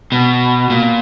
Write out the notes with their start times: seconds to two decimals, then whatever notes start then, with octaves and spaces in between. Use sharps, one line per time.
0.12 B2
0.70 A#2